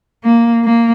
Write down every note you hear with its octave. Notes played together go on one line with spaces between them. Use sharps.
A#3
A#3